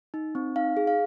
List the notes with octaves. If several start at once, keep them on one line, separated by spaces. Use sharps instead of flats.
D#4
C4
D#4 F5
G#4
F5